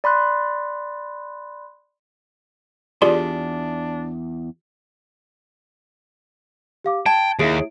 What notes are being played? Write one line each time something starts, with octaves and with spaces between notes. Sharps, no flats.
D5 B5 C6 F#6
E2 G2 D4 F4 G4 G#4 D5 C6
G4 F5 D6
G5 A5 G#6
D#2 E4 G#4 E5 D7